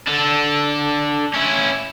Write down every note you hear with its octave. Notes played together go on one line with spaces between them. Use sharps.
D4 A4
C#4 E4